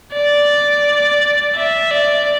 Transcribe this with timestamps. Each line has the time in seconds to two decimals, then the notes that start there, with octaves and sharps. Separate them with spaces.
0.13 D5
1.56 E5
1.91 D5